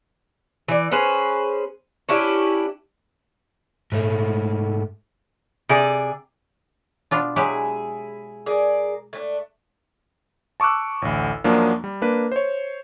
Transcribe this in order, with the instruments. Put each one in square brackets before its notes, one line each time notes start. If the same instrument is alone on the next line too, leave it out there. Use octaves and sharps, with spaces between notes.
[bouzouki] E3 D5
C#4 G#4 B4 C5
C#4 D4 E4 G4
[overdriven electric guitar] G#2 A3
[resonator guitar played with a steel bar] C3 G#4 D5
[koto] B2 D4 F4
[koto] F#3 G#3 G4 [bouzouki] E4 G#4
[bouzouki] G#4 A#4 D5
A3 D4
[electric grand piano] A5 C#6 D6 E6 F#6
A1 D2
F#2 F3 F#3 A#3 D4
G3
A#3 D4 B4
C5 C#5